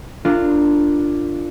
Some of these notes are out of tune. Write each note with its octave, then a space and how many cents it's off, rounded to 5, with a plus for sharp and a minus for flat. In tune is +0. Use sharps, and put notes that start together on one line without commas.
D4 +0 F4 -15 A#4 -35